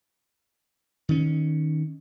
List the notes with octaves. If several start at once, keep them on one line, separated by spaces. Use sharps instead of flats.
D#3 C#4